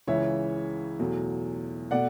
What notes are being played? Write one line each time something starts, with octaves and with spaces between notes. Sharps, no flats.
C#2 C#3 E3 C#5 E5
E2 B2 F#3 A3
B2 A3 D5 F#5